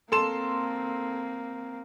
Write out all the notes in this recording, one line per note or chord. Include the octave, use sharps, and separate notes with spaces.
A#3 C4 A4 C6 E7